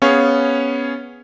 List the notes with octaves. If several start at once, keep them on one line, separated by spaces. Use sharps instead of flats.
B3 C#4 G#4 C#5 F5